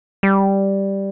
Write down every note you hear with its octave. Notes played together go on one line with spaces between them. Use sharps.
G3